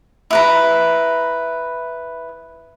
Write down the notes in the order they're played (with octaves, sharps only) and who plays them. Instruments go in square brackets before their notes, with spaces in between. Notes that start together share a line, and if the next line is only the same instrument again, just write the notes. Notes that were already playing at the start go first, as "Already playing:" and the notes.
[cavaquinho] E4 B4 A#5